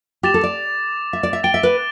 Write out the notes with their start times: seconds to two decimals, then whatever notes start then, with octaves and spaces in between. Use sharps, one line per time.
0.23 G4 D6 A6 E7
0.34 A4
0.44 D5
1.13 E5
1.23 D5
1.33 E5
1.43 G5 A6 D7 G7
1.54 E5
1.63 B4